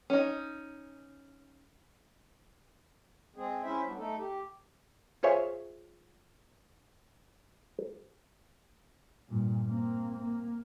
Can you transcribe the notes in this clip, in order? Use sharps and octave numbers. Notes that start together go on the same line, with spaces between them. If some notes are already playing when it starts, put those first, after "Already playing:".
C#4 D#4
G#3 C4 G#4
C#4 E4 C5 E5
F#3 G3 B3 D4
A3 D#4 A4
G4
F4 G#4 C5 C#5 E5
G2 A#2
A#3 C4
A#3